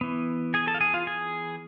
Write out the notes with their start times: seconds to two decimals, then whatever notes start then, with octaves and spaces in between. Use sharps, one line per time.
0.01 E3 B3
0.54 G#4 G#5
0.67 A4 A5
0.74 F5
0.81 G#4 G#5
0.94 F4 F5
1.07 G#4 G#5